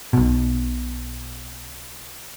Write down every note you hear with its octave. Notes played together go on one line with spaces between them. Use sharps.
B1 B2